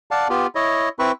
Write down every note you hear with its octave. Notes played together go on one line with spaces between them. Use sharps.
D5 F5 F#5 A5
B3 F4 G4
E4 C#5 D#5
C4 E4 B4 B5 C#6